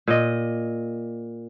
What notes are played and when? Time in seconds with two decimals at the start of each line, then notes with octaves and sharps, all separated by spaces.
0.07 A#2 D#5